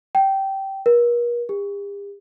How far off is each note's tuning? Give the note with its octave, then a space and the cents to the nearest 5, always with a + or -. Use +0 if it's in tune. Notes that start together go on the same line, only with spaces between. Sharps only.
G5 -15
A#4 +40
G4 +45